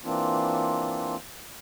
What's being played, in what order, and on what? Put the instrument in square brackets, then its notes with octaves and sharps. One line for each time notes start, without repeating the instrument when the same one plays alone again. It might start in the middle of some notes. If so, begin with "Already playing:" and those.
[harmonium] E3 A#3 C4 D4 F4